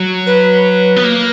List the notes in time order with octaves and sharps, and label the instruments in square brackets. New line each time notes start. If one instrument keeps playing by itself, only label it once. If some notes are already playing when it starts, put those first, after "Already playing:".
Already playing: [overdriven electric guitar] F#3
[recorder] B4
[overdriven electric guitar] B3
A#3